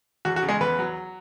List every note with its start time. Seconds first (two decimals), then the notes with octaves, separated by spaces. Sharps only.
0.25 E2 F#4
0.36 F#4
0.43 C#3
0.49 G#3 G#4
0.60 E2 B3 B4
0.79 F#3